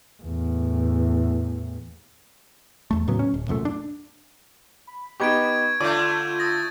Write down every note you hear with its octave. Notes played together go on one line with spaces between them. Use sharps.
E2 A2
E2 A3
A2 C#3 F#3 B3
C#4
D1
C2 F#2 A#2 A3
D4
B5
B3 D#4 G4 B5 C#6 G#6 D7
D3 A3 F4 D5 G6 D#7
D#6 A6 A#6